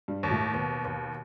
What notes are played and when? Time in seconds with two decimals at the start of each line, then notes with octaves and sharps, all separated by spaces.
0.08 G2 G3
0.23 D#2
0.31 A2 A3
0.53 D#2 B2 B3
0.85 D#2